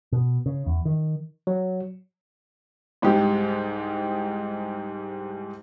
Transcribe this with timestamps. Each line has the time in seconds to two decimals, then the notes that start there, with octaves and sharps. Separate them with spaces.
0.12 B2
0.46 C#3
0.66 E2
0.85 D#3
1.47 F#3
3.02 C2 G#2 G#3 D#4 G4